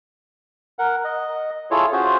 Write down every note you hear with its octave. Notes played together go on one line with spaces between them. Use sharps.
A#4 F#5
D#5
E4 F4 G#4 A4 C#5
C#4 F4 F#4 G#4 C5